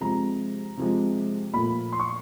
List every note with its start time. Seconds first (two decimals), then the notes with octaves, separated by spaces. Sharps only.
0.01 C3 F3 G#3 A#5
0.77 C3 F3 G#3
1.54 A#2 F3 A3 B5
1.93 C6
2.00 C#6